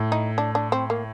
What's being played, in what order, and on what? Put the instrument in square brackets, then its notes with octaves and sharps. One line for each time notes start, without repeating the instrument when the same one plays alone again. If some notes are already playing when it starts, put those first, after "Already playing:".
Already playing: [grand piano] A2
[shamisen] D#4
D4
D4
C4
A#3